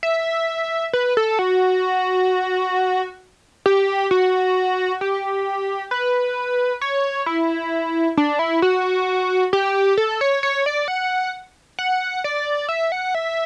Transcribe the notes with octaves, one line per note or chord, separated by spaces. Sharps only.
E5
B4
A4
F#4
G4
F#4
G4
B4
C#5
E4
D4
E4
F#4
G4
A4
C#5
C#5
D5
F#5
F#5
D5
E5
F#5
E5